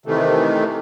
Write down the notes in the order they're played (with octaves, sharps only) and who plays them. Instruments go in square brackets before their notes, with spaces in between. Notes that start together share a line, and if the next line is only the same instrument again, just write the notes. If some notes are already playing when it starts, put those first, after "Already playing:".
[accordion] C3 D#3 E3 A3